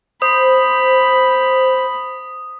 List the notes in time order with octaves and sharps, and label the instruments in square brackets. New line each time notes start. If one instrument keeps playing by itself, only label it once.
[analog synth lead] C5 [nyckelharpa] B5 [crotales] D#6